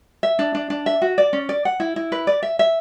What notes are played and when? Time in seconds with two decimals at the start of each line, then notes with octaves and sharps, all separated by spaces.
0.23 E5
0.39 D4
0.55 D4
0.70 D4
0.86 E5
1.02 F#4
1.18 D5
1.33 C#4
1.49 D5
1.65 F#5
1.80 E4
1.96 E4
2.12 B4
2.27 D5
2.43 E5
2.59 E5